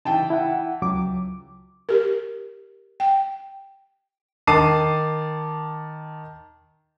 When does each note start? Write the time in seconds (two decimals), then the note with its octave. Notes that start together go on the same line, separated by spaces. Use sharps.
0.05 C#3 E3 D#4 G5 A5
0.30 E4 F#5
0.82 C#2 F#3 D6
1.89 G4 A#4
3.00 G5
4.47 D#3 A5 D6 C7 D#7